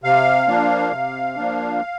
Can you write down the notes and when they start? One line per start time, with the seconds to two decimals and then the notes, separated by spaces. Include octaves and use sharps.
0.04 C3 F5
0.48 F3 A#3 D4
0.92 C3
1.37 F3 A#3 D4